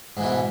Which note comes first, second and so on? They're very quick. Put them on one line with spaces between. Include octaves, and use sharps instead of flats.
G#2 E3 B2